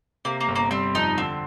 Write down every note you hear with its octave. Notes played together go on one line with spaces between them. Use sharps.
C3 A#3
A#3
G1
A#3
G3 C4
F2 D#4
D3 C4